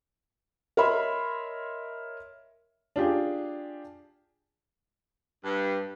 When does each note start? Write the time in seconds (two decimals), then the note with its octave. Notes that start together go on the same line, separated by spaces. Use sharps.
0.77 A#4 C#5 D#5 E5 B5 C6
2.96 D4 F4 G4 G#4
5.45 G2